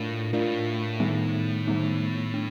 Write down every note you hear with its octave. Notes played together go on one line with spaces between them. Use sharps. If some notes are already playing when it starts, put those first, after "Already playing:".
Already playing: A2 D4 F4 A#4 D5 F5
A2 D4 F4 A#4 D5 F5
D#3 G3 B3 D#4
D#3 G3 B3 D#4
D4